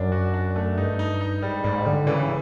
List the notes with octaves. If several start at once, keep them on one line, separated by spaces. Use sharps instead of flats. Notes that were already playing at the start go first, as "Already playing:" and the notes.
Already playing: F#2 D4
F#4
D4
A3
G2 D#4
D#4
D#4
G#2 G3
G#2 G3
D3 G3
C#3 E3